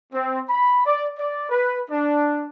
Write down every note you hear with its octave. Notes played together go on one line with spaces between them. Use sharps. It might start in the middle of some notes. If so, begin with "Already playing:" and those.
C4
B5
D5
D5
B4
D4